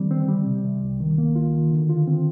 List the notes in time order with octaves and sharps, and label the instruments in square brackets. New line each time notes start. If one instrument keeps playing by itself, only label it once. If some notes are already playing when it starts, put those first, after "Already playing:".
Already playing: [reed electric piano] D3 D#3 G3 C4
C4
G3
C3
C3
C2
D#3
A#3
F4
D#3
D3
F4
C4